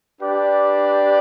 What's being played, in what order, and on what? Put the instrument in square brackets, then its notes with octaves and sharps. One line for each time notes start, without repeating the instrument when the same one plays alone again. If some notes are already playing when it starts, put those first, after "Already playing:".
[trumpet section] D4 G4 B4 D5